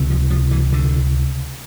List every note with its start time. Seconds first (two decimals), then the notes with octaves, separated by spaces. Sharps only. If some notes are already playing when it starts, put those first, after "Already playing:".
Already playing: C#2 C3
0.10 F3
0.30 F3
0.51 E3
0.72 D3